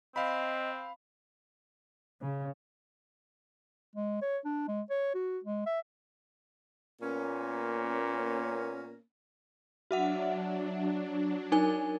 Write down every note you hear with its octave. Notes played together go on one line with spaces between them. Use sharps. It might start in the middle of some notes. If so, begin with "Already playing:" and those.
C4 D#5 F5 B5
C#3
G#3
C#5
D4
G#3
C#5
F#4
G#3
E5
A#2 A#3 B3 C#4
F#3 D4 F#4 E5 F#5
D#4 A#4 G#5